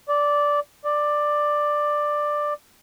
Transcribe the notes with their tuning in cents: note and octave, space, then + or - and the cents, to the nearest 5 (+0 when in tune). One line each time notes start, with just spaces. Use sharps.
D5 -10
D5 +10